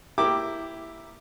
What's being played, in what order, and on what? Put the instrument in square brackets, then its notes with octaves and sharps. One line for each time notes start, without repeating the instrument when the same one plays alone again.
[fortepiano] A#3 E4 G4 D6